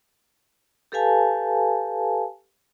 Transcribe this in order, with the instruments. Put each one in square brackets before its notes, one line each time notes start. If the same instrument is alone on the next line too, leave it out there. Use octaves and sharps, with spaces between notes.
[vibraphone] G4 A4 B4 F5 G#5 A5